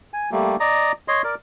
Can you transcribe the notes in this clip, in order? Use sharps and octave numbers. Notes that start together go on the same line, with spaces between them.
G#5
G3 A3 A#3
D5 D#5 A#5
C#5 D#5 C6
A#4 D5